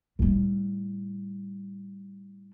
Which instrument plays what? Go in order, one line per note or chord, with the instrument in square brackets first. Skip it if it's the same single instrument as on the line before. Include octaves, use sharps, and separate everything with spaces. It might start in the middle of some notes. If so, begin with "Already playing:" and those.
[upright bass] A2 G3